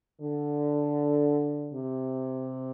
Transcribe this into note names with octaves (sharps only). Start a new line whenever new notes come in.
D3
C3